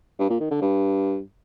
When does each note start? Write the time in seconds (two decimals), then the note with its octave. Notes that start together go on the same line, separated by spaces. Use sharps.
0.19 G2
0.30 A#2
0.40 D#3
0.51 D3
0.61 G2